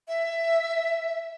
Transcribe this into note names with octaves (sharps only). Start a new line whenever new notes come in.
E5